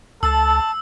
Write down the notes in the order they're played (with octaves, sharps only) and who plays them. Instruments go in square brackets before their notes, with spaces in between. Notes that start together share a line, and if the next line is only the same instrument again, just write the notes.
[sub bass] C#2 [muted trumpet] A4 [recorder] A5 [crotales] E6